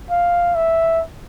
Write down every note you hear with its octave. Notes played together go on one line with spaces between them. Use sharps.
F5
E5